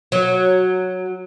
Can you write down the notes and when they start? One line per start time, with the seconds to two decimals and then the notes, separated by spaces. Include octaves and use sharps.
0.12 F#3